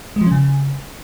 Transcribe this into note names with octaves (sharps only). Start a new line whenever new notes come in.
G#3
F3
C#4
C#3